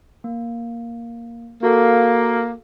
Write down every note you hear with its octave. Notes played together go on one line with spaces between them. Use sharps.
A#3
A#3 F#4 A4 F5